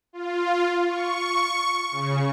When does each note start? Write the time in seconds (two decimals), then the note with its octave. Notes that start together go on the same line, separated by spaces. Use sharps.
0.13 F4
0.89 C#6
1.92 C#3